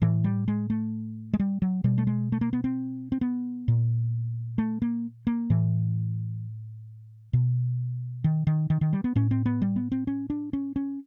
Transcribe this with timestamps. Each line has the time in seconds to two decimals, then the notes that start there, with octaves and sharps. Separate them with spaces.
0.02 A2 E3
0.24 G3
0.48 G#3
0.70 A3
1.34 G#3
1.40 G3
1.62 F#3
1.84 B2 G3
1.98 A3
2.07 G#3
2.32 A3
2.41 A#3
2.53 B3
2.64 C4
3.12 C4
3.21 B3
3.68 A#2
4.58 A3
4.82 A#3
5.27 A#3
5.50 A2 E3
7.33 B2
8.24 D#3
8.47 D#3
8.70 D#3
8.81 D#3
8.93 G3
9.04 B3
9.16 A2 C#4
9.31 C4
9.46 B3
9.62 G3
9.76 B3
9.92 C4
10.07 C#4
10.30 D4
10.53 C#4
10.76 C#4